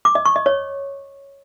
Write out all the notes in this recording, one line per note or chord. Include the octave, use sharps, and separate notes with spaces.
D6
D#5
C#6
D#5
C#5